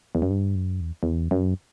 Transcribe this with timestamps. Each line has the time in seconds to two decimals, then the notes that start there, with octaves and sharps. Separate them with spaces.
0.15 E2
0.22 F#2
0.30 G2
0.55 F#2
0.81 E2
1.03 E2
1.31 F#2